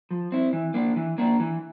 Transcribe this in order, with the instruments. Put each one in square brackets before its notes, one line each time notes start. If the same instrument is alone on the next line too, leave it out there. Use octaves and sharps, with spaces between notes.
[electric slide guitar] F3
C4 E4
E3
A#3 D4
E3
A#3 D4
E3